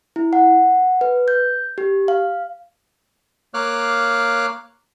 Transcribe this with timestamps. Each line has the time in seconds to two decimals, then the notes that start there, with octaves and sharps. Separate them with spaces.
0.16 E4
0.33 F#5
1.01 B4
1.28 G6
1.78 G4
2.08 F5
3.54 A#3 C#5 F5 D6 F6 F#6